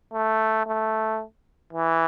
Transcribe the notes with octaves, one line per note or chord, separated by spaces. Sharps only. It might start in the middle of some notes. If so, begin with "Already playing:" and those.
A3
A3
E3